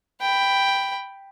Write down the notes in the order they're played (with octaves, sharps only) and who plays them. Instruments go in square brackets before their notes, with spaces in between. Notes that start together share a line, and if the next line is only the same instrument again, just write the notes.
[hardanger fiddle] G5 B5